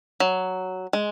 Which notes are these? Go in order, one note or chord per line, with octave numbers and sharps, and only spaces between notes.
F#3
G#3